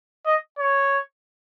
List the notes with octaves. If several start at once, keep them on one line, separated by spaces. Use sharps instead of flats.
D#5
C#5